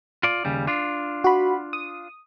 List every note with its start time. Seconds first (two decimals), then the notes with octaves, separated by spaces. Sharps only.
0.23 F4 D5
0.45 D#2 C#3 G3
0.67 D4 F4
1.24 F#4 B5
1.73 D#6